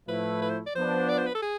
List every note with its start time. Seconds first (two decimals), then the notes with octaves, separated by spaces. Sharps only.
0.08 A2 F3 A3 E4 B4
0.42 B4
0.50 C5
0.66 D5
0.75 F3 B3 D4 C5
1.09 D5
1.18 C5
1.26 B4
1.34 A4
1.42 G#4